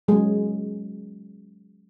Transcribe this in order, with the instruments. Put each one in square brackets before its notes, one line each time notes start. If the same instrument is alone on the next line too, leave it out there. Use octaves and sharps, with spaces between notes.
[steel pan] F#3 G#3 A#3 C#4 G#4